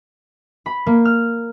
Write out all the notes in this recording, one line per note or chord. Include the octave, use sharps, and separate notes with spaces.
B5
A#3
F6